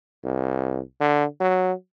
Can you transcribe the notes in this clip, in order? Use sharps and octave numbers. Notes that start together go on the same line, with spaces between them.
C2
D3
F#3